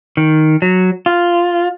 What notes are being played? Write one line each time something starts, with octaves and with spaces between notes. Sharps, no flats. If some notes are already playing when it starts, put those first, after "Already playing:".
D#3
F#3
F4